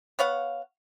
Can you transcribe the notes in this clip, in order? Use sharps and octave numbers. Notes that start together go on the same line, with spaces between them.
B3 C#5 F5 F#5